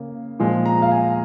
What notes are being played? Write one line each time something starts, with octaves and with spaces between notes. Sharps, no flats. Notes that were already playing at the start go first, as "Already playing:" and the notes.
Already playing: C#3 A#3
A#2 F3 G#3
A#5
F5
G#5